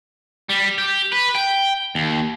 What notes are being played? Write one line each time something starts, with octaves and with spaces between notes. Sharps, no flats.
G3
G4
B4
G5
D#2